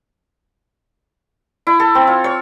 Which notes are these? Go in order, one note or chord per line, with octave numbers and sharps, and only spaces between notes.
E4
A4
C4
F4
C#5